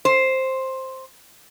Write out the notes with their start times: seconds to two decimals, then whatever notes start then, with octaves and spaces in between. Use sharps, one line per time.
0.05 C5